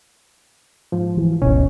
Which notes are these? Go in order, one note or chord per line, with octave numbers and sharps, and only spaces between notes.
G#2 F3
E3
D1 G#1 B2 C#4